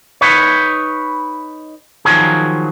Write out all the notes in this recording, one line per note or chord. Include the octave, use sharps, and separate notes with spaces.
D#4 B4 C#5
D#3 F3 F#3 G#4